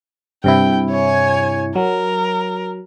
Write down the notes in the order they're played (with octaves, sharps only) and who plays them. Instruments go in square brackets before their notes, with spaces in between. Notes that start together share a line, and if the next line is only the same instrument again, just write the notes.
[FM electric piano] G2 C3 E4 [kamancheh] G5
[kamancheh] C#5 G#5
[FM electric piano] F#3 [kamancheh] A#4